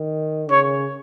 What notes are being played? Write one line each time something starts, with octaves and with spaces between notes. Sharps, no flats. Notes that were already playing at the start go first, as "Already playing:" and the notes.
Already playing: D#3
C#3 C#5